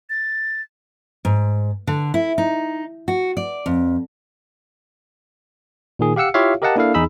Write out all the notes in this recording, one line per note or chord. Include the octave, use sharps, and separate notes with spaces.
A6
G#2
D3
E4
D#4
F#4
D5
F2
A#2 D#3 G#4
G4 F5 F#5 E6 C#7
E4 F4 G4 C#5 E5 F5
G4 A#4 D#5 F5 F#5 A5
A#3 D4 E4 A4 F5
E2 D#4 G#4 B5 E6